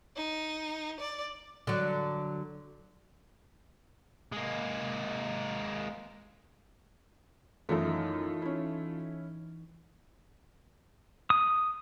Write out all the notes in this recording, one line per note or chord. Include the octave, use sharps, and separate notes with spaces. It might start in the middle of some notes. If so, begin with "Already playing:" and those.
D#4
D5
D3 F#3
G#3 A#3
F#2 E3 A3 D#4 F4 A4
C#4 E4
D#6